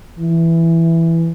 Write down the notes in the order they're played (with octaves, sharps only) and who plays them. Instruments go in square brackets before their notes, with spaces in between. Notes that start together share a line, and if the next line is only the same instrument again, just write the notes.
[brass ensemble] E3